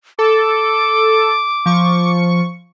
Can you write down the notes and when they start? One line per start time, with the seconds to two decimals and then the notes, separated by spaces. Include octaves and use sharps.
0.19 A4 D6
1.66 F3 C#6